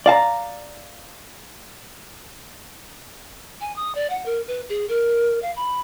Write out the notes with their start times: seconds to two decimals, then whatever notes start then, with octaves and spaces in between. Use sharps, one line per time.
0.06 D5 F5 A5 A#5
3.61 G#5
3.76 D#6
3.95 D5
4.10 F#5
4.26 A#4
4.48 B4
4.69 G#4
4.89 A#4
5.42 F5
5.56 B5